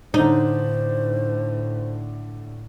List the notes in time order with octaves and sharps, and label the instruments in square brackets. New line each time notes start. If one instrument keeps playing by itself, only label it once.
[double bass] A2 [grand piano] D3 D4 [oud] D#4 [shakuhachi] C5